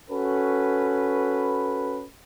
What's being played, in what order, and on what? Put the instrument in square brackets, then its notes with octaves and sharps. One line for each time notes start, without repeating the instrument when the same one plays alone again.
[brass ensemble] C#4 F#4 A4 B4